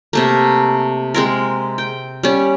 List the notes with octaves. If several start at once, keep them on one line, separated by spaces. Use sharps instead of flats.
C3 A3 A#3
G#3 C4 A#4
G5
G3 C#4